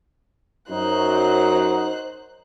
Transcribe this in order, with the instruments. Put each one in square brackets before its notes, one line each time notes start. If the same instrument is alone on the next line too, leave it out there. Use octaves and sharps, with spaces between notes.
[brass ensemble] F#2 F#3 [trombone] D#4 [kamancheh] C5 F#6